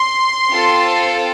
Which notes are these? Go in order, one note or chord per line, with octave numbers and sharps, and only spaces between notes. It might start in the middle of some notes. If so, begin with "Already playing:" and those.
Already playing: C6
C4 F4 A4